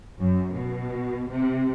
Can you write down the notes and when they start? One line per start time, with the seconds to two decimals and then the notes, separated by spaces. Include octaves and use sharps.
0.19 F#2
0.55 B2
1.31 C3